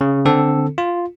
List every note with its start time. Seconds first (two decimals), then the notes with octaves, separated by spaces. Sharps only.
0.01 C#3
0.25 D3 C4 A4
0.78 F4